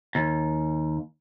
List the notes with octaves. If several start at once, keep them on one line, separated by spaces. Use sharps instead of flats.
D#2